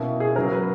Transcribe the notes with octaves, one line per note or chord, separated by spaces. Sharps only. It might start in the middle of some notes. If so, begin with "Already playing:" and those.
Already playing: B2 A#3 C#4 E4
G#4
C#3 F#3 C#4 A#4
B4